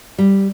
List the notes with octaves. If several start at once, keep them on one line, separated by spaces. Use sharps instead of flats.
G3